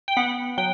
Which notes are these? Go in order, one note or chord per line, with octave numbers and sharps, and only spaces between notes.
G5
B3 F#5
F#3 G5